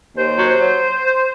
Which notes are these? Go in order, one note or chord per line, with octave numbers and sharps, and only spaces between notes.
D#2 C5
F#3
F#3